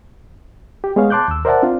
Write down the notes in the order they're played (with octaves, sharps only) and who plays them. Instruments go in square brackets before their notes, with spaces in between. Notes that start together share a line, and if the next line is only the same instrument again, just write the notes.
[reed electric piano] G4
G#3 B3 G#4 C#5 F5
A5 C6 D6 F#6 G6
D#2 E6
A#4 C5 D5 E5 F#5 A5
C4 D4 F4